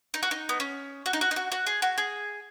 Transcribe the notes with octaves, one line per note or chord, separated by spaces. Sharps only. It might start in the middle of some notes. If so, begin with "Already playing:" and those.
D#4
F#4
D#4
B3
C#4
F#4
D#4
F#4
D#4
F#4
F#4
G#4
F#4
G#4